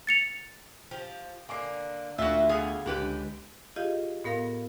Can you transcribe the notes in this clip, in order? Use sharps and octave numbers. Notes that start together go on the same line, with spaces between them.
A6 C#7 F7
F3 G4
D3 A#3 G#5 D6 C7
D2 D3 F4 F#4 E5 G7
B3 F4 G#4
C#2 D3 G4 B4
F4 G4 G#4 D#5 F5
A2 B3 A#4 F5 B5